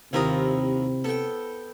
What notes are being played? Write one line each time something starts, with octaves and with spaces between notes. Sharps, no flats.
D#2 C3 C4 E4 F4 A#4 D#6
B3 A4 G5